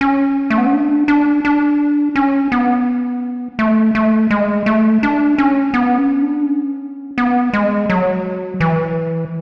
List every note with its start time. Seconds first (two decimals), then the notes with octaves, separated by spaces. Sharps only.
0.01 C#4
0.50 A3
0.58 B3
0.66 C#4
0.73 D4
1.08 D4
1.45 D4
2.16 C#4
2.52 B3
3.59 A3
3.95 A3
4.31 G#3
4.66 A3
5.03 D4
5.38 C#4
5.74 B3
5.98 C#4
6.22 D4
6.46 C#4
7.18 B3
7.53 G#3
7.90 F#3
8.60 E3